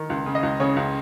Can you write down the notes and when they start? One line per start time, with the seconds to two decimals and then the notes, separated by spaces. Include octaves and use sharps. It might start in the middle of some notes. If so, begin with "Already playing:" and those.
Already playing: D#3
0.10 C#2
0.26 C#3
0.35 D#5
0.43 C#2
0.60 C#3 C#5
0.76 C#2